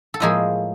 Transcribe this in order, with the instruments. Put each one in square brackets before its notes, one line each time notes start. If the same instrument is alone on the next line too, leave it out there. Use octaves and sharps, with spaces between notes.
[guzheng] A4
A2 F3 G#3 A#3 G#4